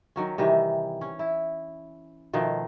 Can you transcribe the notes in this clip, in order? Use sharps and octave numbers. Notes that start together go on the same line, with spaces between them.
D#3 F#3 C#4
C3 D#3 E3 G3
C#4
E4
B2 D#3 F3 A3